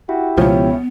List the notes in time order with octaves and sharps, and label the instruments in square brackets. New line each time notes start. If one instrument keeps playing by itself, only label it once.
[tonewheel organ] E4 G4 [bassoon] F#4
[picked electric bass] C#2 B2 F3 [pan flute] B3 [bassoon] C#4